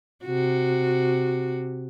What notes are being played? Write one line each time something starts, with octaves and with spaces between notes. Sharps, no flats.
C3 F#4